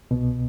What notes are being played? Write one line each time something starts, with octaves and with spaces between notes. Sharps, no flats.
C2 B2